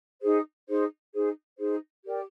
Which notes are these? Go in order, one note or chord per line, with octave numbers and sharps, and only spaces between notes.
D#4 G#4 C5
D#4 G#4 C5
D#4 G#4 C5
D#4 G#4 C5
G4 A#4 D5 G5